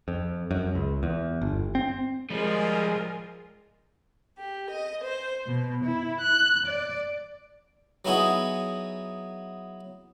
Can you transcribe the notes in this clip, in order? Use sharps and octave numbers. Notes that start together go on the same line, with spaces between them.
F2
F#2
C#2
E2
G1
C4
F3 G3 G#3 F4 G#4 A#4
G4
D#5
C5
B2
E4
F#6
D5
F#3 B3 D#4 E4 F#4 G#4